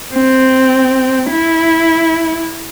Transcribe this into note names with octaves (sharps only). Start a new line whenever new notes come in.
C4
E4